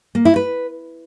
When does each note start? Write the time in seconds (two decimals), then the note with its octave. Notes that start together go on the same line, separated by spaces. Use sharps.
0.15 A#3
0.25 E4
0.36 B4